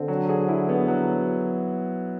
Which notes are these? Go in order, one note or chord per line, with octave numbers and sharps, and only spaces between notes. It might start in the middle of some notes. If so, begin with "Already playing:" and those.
Already playing: D3 C4
F#3
G#4
E4
B3
F#3